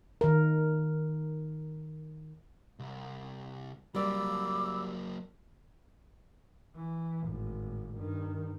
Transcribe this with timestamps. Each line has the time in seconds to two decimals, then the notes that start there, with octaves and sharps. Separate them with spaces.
0.21 D#3 A#4
2.79 C2
3.95 F#3 G3 A#3 D5 B5 D6 E6
6.75 E3
7.26 G#1 A2
7.97 G2 D#3